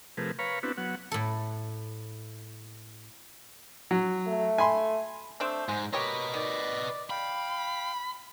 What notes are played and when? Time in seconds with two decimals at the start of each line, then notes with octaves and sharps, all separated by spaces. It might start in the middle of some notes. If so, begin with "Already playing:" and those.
0.17 C3 F3 A3 G#4 A#4 B4
0.39 B4 C#5 F5 A#5 B5 C#6
0.63 B3 C4 D4 E4 F#4 B4
0.77 F#3 B3 F#5
1.12 A2 A4
3.91 F#3
4.27 A3
4.58 G#5 B5 C6
5.40 A3 C4 D4 C5 G6
5.69 G#2 G#3
5.93 G4 A#4 B4 C#5 D#5 B5
6.34 D#3 D5
7.10 F5 G5 B5